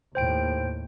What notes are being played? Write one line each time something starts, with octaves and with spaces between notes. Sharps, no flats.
D#2 A2 C5 G5 D7